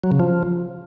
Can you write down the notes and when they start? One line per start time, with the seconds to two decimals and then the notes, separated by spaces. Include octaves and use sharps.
0.04 F#3
0.12 C#3
0.20 F3